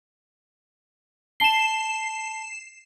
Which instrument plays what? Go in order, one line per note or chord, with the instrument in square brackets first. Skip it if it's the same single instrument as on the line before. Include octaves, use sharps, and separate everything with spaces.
[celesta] A5 G7 [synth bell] C7 E7